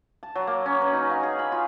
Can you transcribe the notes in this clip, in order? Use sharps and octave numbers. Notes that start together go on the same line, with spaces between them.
A5
F#3
A#3
C#4
B4
D#4
F5
G#4
B5
F4